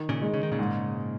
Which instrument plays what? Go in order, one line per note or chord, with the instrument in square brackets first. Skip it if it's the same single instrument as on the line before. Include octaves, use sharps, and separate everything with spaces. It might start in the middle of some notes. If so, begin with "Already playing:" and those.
Already playing: [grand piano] D#3
[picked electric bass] A#2 C#3
[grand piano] G#3 D#4
[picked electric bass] C#3
D#3
A#2 C#3
[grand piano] G#2